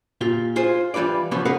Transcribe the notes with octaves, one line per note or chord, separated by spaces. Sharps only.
A#2 F4 G4
F4 G#4 C5
E3 G3 F4 B4 D5
C3 F3 G3 B3 C#4
G#4 A#4 B4 F5 F#5